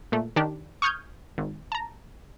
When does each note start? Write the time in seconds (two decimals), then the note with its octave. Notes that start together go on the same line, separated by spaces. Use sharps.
0.12 A#2 A3
0.36 D#3 D4 G4
0.82 C#6 D#6 F6 G6 G#6
1.38 G#1
1.72 A5 A#5